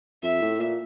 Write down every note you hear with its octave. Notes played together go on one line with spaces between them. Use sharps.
F2 E5
A2
A#2